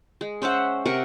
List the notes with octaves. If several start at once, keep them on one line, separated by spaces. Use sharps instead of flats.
G#3
C#4 C5 E5 F#5
C3 A#4 F#5 C#6